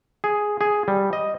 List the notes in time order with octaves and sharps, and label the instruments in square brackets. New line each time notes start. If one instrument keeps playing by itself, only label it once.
[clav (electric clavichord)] G#4
G#4
G3
D#5